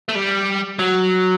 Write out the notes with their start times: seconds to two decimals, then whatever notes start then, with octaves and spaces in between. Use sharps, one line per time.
0.09 A3
0.15 G3
0.79 F#3